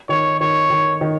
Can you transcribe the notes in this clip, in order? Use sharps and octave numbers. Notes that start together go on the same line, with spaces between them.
D#3 C#5
D#3 C#5
D#3
D#3